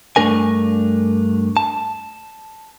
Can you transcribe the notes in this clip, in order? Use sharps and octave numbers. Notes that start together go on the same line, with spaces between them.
G2 A3 D4 A#4 G#5
A5